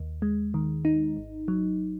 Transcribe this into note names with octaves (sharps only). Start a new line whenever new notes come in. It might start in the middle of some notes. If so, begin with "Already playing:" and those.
Already playing: D#2
G#3
D#3
D#4
G#1
F#3